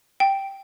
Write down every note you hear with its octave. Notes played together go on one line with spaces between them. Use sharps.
G5